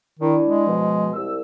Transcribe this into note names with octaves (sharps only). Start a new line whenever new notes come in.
D#3 D4 E4
G#3
B2 F3
C2 E6